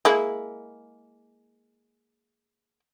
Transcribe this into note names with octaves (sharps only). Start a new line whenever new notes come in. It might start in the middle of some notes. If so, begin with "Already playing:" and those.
G#3 A#3 E4